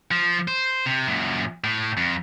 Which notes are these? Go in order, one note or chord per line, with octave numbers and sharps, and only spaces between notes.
F3
C5
C3
F#2 A#2
A2
F2